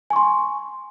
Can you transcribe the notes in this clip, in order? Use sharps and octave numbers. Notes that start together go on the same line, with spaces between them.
G#5 C6 C#6